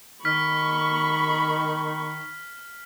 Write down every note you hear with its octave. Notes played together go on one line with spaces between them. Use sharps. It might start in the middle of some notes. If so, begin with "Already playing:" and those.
D#3 B5 C#6 F6 B6